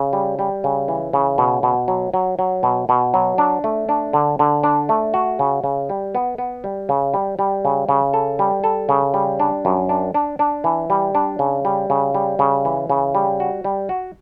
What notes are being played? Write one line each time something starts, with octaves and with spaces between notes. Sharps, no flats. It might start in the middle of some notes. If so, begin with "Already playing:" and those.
Already playing: C#3
G3
G3
C#3
E3
C#3
B2
B2
F#3
F#3
F#3
B2
B2
F#3
D4
A3
D4
D3
D3
D4
A3
F#4
C#3
C#3
G3
B3
B3
G3
C#3
G3
G3
C#3
C#3
A4
G3
A4
C#3
G3
D4
F#2
D4
D4
D4
E3
G3
D4
C#3
G3
C#3
G3
C#3
E3
C#3
G3
F#4
G3
F#4